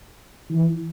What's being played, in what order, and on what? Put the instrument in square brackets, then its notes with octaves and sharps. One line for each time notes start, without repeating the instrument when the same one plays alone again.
[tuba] E3